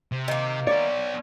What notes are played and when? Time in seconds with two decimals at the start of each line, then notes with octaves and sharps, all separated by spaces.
0.12 C3
0.28 D#3 A#3
0.67 B3 C#5 D5